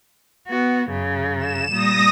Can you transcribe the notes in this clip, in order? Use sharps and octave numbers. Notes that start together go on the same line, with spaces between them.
B3 F#4
F#2 C#3
E7
A#2 G3 D#6 A#6